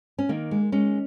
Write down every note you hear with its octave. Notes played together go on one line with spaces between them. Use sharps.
C#4
D#3 A#3
G#3
G#3 C#4